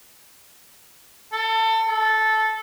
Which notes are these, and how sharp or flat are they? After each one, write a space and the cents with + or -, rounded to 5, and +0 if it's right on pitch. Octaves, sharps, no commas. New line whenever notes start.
A4 +25
A4 -10